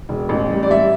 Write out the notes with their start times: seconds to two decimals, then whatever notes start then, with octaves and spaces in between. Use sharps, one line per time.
0.09 E1
0.29 A1
0.51 G3
0.63 D5
0.70 G3 E5